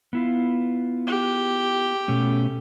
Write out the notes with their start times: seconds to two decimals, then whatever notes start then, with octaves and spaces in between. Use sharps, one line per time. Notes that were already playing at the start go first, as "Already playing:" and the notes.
0.13 B3 E4 F4
1.07 G4
2.08 B2 A3 C#4